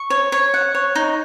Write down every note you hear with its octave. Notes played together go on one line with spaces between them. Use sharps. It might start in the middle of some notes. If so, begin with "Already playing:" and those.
Already playing: C#6
C#5
C#5
F#5
C#5
D#4